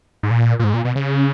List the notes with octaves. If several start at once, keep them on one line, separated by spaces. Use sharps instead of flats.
G#2
A#2
A#2
G#2
A#2
B2
C#3